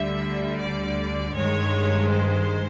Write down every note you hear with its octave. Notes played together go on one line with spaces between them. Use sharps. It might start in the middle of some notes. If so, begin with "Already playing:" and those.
Already playing: D2 D3 G3 E5
D5
G2 D#3 G#3 C#5
C5